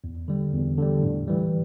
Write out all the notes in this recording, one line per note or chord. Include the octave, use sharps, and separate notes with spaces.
E2
D3 G3
E2
D3 G3
A2
E3 G3